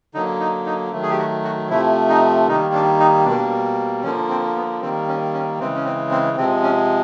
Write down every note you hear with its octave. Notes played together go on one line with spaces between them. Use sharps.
D3 F#3 A#3 D#4
D#4
D#4
D#3 F#3 A3
G#4
G4
F#4
F#4
C3 F3 A3 E4
D#4
D#3 G3 A#3 D#4
D4
D#4
B2 G3 A#3 D4
D3 F3 A#3 C#4
C4
B3
D#3 G3 A#3 C4
C#4
C#4
C#3 E3 G#3 C4
C#4
C4
C4
C3 F3 G#3 C4
C#4